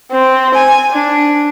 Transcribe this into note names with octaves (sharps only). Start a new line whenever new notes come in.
C4
G#5
D4